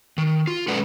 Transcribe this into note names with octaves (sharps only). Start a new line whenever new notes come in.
D#3
F4
G#3 C#4 A4 B4 D5 F#5